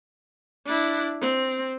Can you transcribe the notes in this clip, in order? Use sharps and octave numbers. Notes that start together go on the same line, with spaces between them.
D4 E4
C4